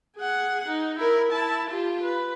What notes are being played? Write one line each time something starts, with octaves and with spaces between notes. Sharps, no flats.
G#4 F#5
D#4
E4 A#4
E4 A5
F4 G4
B4